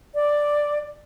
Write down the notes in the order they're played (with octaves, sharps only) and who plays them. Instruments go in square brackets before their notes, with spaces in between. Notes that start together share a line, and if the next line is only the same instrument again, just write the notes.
[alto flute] D5